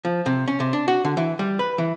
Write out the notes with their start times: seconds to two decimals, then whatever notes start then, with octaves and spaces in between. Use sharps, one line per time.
0.05 F3
0.26 C3
0.48 C#4
0.60 C3
0.73 D4
0.88 F#4
1.05 D3
1.17 E3
1.39 G3
1.59 B4
1.78 E3